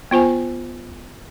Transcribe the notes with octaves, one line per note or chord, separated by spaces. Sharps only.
B3 F4 C5 G#5